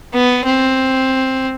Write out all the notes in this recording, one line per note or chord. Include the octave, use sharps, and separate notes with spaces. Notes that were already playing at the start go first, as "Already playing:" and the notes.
B3
C4